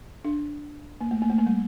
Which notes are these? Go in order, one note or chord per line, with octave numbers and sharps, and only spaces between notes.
D4
A#3
A3
A#3
A3
A#3
G3